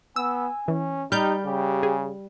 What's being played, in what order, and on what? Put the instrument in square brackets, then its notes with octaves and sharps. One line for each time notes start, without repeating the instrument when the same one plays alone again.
[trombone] B3 [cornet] G#5 [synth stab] E6
[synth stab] E3 [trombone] C#4
[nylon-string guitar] G3 [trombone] D#4 [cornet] G4 [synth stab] F6 G6
[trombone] C#3 [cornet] G4
[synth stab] G#4